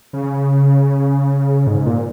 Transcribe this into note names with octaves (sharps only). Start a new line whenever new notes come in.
C#3
G#2
A#2